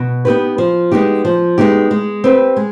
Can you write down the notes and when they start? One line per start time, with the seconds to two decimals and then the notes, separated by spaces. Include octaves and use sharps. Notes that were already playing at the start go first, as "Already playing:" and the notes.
Already playing: B2
0.25 B3 D#4 G4 B4
0.58 F3
0.92 G#3 B3 D#4 G4
1.25 F3
1.58 G#3 B3 D#4 G4
1.91 G#3
2.24 C4 G4 B4
2.56 G#3